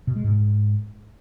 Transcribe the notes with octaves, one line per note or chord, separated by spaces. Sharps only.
B2
G#3
G#2